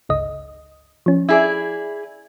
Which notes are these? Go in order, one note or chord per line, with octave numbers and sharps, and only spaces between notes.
G1 C#2 D#5
F3 C#4
E4 G#4 D5